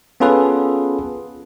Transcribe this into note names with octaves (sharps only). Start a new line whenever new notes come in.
B3 C#4 F4 G#4 A4 B4